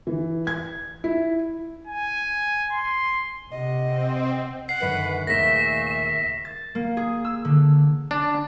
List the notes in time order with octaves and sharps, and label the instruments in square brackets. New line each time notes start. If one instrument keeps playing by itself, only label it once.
[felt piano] E3
G#6
E4
[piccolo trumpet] G#5
C6
[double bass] C3 [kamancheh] D#5 F#5
[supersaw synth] C4
[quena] F#5 [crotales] C7
[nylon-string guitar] F#2 D3 D#3 [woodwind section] B4
[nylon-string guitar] D#2 A#4 [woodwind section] A#2 C#3 A3 [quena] E5 [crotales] A#6 B6
[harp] A6
A#3
G#4
E6
D3
[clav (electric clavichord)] D4